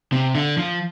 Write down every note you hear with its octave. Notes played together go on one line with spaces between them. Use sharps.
C3
D3
F3